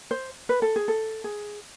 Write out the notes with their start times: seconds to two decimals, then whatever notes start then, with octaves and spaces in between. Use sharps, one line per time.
0.11 C5
0.49 B4
0.62 A4
0.76 G#4
0.88 A4
1.24 G#4